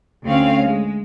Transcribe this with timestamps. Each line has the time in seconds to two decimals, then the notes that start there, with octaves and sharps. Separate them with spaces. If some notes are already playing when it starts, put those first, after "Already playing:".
0.25 D2 C4 C#4 F5
0.65 G#3